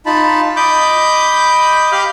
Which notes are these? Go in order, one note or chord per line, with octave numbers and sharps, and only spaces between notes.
D#4 F4 A5 B5
D#5 B5 D6 G6
G4 F5 B5 D6 F6 G6